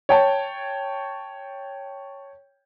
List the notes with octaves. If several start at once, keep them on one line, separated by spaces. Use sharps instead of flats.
C#5 G5 A5